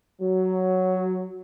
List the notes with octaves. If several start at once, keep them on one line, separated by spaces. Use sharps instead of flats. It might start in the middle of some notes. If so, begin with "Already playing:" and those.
F#3